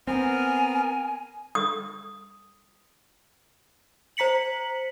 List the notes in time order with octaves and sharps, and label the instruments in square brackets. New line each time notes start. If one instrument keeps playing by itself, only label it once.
[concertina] B3 A#4 F6 [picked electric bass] C4 [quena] G#5
[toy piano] D#6
[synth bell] C5 A#5 B6 C#7 F#7